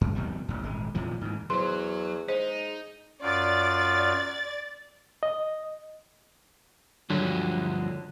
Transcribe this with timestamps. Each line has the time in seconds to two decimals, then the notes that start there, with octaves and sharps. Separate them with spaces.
0.01 F#2
0.15 F2 B2 D#3 G3
0.48 A1 E2
0.62 D#1 G#1 G#3
0.94 F2 A#2 E3 F3
1.21 G#2 E3
1.50 E2 F#3 C5 C6
2.29 G#3 D#4 C5
3.22 F#2 F4 D5 A6
5.23 D#5
7.10 D2 G2 D3 F3 F#3